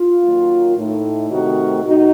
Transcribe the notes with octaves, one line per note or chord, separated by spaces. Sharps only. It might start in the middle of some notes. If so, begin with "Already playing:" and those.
Already playing: F4
D#3 F#3 A#3
A2 A3 D#4
C3 D#3 A3 C4 F#4 A#4
A2 D#4 F#4